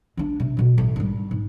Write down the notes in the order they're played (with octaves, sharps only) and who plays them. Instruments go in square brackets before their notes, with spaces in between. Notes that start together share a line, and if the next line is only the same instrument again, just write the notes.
[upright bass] G#3 D4
C3
B2 G#3
A1
G#1 G3
G#2